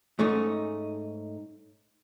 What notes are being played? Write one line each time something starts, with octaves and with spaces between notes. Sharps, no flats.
G#2 A3 C#4 D#4